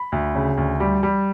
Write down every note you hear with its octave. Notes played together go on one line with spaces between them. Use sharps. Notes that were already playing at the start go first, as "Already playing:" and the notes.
Already playing: B5
D2
C#3
D2
G3
G3